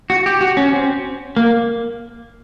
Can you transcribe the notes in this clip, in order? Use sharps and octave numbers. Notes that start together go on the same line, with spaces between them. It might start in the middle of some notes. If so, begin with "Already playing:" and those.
F#4
G4
F#4
C#4
C4
A#3